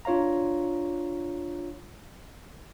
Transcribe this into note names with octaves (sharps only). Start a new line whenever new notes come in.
D4 F4 C#5 F5 A#5